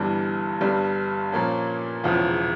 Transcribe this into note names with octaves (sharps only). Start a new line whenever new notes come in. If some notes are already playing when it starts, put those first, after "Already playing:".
Already playing: G1 G2 E3 G3
G1 G2 G3
A#2 F3 A#3 C#4
E1 E2 C#3 F3